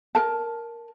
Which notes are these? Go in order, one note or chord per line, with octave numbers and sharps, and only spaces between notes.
A#4 A5